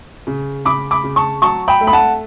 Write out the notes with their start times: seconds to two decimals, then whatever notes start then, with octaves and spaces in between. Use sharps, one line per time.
0.27 C#3
0.65 C#3 B5 D6
0.91 B5 D6
1.04 C#3
1.16 A5 C#6
1.42 F#3 A5 C#6
1.68 G5 B5
1.81 A3
1.87 B5
1.93 F#5 A5